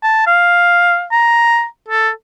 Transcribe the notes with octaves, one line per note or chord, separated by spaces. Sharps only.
A5
F5
A#5
A4